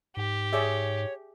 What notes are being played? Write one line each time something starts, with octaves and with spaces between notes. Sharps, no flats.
G#2 G4
G#4 C#5 D5 E5